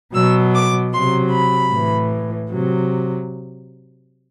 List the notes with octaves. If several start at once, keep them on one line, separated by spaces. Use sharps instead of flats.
B2 F#3 E6
D6
C3 F#3 C6
B5
A2 E3
C3 F#3